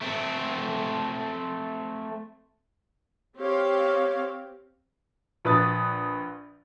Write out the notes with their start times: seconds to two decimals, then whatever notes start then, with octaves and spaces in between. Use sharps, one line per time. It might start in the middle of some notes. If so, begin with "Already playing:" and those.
0.02 A3 C4
3.37 C4 G4 C#5 F5
5.45 A#1 B4 D#6 A6